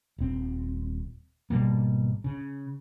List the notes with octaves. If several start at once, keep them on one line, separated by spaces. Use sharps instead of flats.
D#1 C4
G#1 B2 G3 A#3
C#3